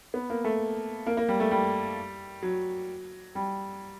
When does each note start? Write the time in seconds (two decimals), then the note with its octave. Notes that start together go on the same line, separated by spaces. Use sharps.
0.14 B3
0.30 A#3
0.45 A3
1.07 A#3
1.17 A#3
1.28 G3
1.40 A3
1.51 G3
2.43 F#3
3.35 G3